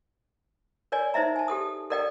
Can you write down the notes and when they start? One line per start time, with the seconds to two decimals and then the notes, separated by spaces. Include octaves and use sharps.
0.92 A#4 C#5 D5 G#5
1.14 D#4 C5 D#5 E5 A#5
1.36 G#5 A5
1.48 G4 A4 D#6
1.90 A4 A#4 D5 D#5 G5